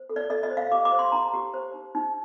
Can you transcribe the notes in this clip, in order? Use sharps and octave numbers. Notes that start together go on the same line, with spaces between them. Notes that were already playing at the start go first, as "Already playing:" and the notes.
Already playing: C5
A4
D5
A4 D#5
D#5
C5
F5
G4 D6
D6
C5
C6
D#4 A#5
G4
C5
D#4
D#4